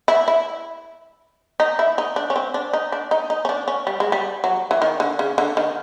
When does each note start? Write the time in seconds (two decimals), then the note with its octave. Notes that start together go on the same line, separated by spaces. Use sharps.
0.08 E4
0.28 E4
1.60 D#4
1.79 E4
1.98 D#4
2.16 D4
2.30 C#4
2.36 C4
2.54 D4
2.73 D#4
2.92 D4
3.11 D#4
3.30 D#4
3.45 C#4
3.49 D4
3.68 C#4
3.87 G3
4.00 G#3
4.12 G3
4.44 F#3
4.71 E3
4.82 D#3
5.00 D3
5.19 C#3
5.38 D3
5.57 D#3